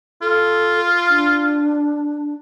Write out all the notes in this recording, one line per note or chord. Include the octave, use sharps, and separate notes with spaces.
F4 A4
D4